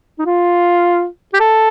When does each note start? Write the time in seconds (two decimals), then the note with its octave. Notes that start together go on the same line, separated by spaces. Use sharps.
0.19 D#4
0.26 F4
1.34 G4
1.40 A4